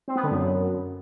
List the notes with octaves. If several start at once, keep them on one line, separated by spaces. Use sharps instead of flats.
C4
B3
D3
F#2